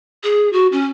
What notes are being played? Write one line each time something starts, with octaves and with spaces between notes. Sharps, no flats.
G#4
F#4
C#4